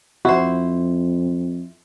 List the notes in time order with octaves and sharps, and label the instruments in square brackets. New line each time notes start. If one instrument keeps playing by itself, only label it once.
[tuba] F2 [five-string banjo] E4 C5 [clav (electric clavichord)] F#4